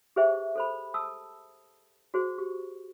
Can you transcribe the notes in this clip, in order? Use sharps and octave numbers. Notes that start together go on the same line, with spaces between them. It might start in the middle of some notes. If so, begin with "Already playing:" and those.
G4 G#4 B4 C5 E5 G5
A4 C5 B5
A5 D#6 E6
F#4 G#4 C5
G4